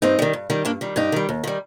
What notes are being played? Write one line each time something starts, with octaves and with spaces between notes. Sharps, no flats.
G2 C4 D#4
D#3 G3
G2
D#3 G3
G2 A#3 D4
D#3 G3
G2 D#4 G4
D#3 G3
D#2
D#3 G3